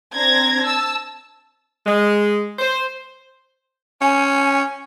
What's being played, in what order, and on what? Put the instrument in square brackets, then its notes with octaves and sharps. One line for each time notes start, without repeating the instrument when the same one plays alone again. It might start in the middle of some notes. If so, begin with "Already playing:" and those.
[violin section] C4 D4 A#5 G#6 A#6
A5 E6
[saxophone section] G#3
C5
[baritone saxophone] C#4 [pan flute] G#5